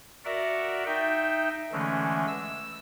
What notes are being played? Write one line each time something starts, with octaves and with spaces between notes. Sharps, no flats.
F#4 A#4 D5 E5 F#5
D#4 E5 G5
D3 E3 G#3 A3 C#4
E6